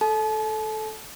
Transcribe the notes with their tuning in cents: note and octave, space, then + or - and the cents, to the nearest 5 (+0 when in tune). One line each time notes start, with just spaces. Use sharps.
A4 -10 A5 -40